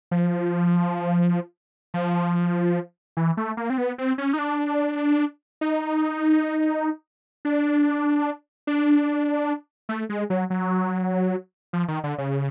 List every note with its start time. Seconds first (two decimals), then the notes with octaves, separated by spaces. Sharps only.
0.11 F3
1.94 F3
3.17 E3
3.37 A3
3.57 A#3
3.70 C4
3.78 B3
3.98 C4
4.18 C#4
4.33 D#4
4.39 D4
5.61 D#4
7.45 D4
8.67 D4
9.89 A3
10.09 G#3
10.30 F#3
10.50 F#3
11.73 F3
11.88 D#3
12.04 D3
12.18 C#3